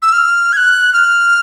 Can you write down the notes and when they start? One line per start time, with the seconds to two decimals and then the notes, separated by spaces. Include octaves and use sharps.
0.02 E6
0.13 F6
0.53 G#6
0.57 F#6
0.93 F6